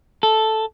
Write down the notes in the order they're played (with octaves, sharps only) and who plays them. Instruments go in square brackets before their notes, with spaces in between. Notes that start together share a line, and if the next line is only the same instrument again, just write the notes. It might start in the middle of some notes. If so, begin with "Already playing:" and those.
[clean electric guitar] A4